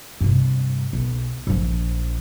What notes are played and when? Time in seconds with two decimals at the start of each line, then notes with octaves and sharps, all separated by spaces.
0.21 G2 C3
0.93 B1
1.47 A#1 F3